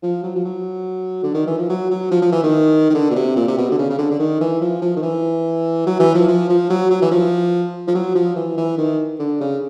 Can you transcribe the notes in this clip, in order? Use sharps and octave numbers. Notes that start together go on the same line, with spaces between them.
F3
F#3
F3
F#3
D3
D#3
E3
F3
F#3
F#3
F3
F3
E3
D#3
D#3
D3
B2
C3
A#2
C3
B2
D3
C#3
C#3
D3
D3
D#3
E3
F3
F3
D#3
E3
F#3
E3
F3
F3
F3
F#3
F#3
E3
F3
F3
F#3
F3
E3
E3
D#3
D3
C#3